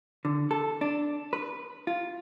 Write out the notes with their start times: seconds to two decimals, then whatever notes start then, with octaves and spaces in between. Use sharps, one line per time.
0.25 D3
0.51 A4
0.81 D4
1.33 B4
1.87 F4